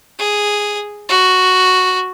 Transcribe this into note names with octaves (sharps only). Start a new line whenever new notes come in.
G#4
F#4